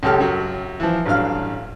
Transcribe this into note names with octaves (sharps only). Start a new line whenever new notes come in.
C#2 F#2 G4 A4 A5 F6
F#2 F#3
E3 F3
A1 G2 F#3 F5 F6